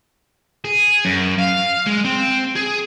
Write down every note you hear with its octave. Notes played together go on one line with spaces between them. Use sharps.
G#4
F#2
F5
G#3
C4
G#4